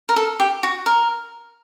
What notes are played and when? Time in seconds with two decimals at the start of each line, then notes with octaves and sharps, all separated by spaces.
0.09 A#4
0.16 A4
0.40 G4
0.63 F#4
0.86 A#4